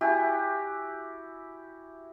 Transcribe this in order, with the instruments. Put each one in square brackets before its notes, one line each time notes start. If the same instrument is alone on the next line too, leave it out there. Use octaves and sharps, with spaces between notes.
[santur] E4 F#4 G4 G#5